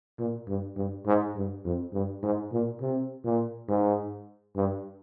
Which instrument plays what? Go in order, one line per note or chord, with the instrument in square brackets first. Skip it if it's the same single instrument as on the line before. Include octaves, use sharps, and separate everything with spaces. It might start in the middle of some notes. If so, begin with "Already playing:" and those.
[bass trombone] A#2
G2
G2
G#2
G2
F2
G2
G#2
A#2
C3
A#2
G#2
G2